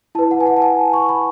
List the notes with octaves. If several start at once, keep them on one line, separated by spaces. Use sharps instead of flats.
E4 B4 A5
F#5
G#5
F#5
A5
G#5
C#6
B5